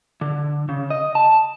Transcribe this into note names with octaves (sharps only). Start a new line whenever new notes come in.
D3
C#3
D#5
A5